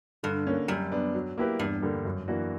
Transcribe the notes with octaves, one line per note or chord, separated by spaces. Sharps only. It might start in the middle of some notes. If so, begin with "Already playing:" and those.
G2 D3
A#3 C#4
F#2 G3
B3 D4
F#3
A#3 E4 G4 B4
E2 G2
D3 G3 A#3
F#2
E3 A#3 D4 F#4